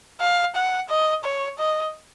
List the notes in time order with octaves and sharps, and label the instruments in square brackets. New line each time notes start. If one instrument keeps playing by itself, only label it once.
[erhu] F5
F#5
D#5
C#5
D#5